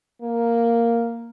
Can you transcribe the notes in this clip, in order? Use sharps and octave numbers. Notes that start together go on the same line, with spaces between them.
A#3